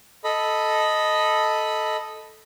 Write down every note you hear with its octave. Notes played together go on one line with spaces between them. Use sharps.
A4 D#5 B5